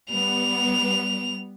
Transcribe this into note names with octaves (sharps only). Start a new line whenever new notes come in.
G3 B3 F7